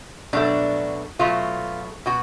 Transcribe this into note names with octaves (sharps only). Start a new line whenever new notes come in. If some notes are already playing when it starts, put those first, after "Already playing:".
B2 F#3 A3 D4
B2 F#3 A3 F4
B2 F#4